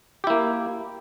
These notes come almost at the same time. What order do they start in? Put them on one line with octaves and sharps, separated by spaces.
G4 E4 A#3